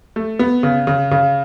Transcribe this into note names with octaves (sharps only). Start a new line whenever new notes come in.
A3
B3
C#3
C#3
C#3